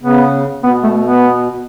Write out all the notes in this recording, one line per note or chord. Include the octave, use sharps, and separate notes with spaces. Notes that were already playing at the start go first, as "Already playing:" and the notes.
C#3 B3
B2 B3
A3
B3